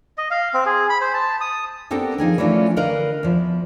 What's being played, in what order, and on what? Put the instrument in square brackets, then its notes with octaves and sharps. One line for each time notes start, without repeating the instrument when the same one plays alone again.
[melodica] D#5
F5
C4
G#4
B5
C5
A5
D#6
[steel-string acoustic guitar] B3 C4 D4 G4 A4 A#4
F3 D#4 G#4 A#4
E3 F3 A3 C#4 D4 F4
D3 A#4 B4 D#5 F5
E2 F3